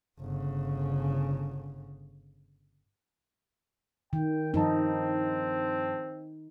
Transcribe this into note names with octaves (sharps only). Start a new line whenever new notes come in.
G1 C#3
D#3 G5
G2 F3 C4 D#4 A5